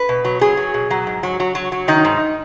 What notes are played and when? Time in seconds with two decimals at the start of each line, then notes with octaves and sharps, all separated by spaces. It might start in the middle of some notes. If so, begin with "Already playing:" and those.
Already playing: B4
0.09 B2
0.25 F#3
0.41 F#3 G#4
0.57 F#3
0.74 B2
0.90 F#3
1.07 G#2
1.23 F#3
1.40 F#3
1.55 F#3
1.72 F#3
1.88 D#3 D#4
2.05 G#2